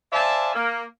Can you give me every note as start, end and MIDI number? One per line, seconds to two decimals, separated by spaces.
0.12 0.53 72
0.12 0.53 74
0.12 0.53 76
0.12 0.53 77
0.12 0.53 80
0.12 0.53 81
0.55 0.83 58